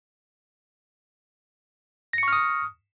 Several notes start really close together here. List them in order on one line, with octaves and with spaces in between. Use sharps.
A#6 C#7 C#6 F6 D#6